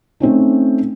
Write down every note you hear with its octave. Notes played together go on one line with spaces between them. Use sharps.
A3 C4 C#4 D#4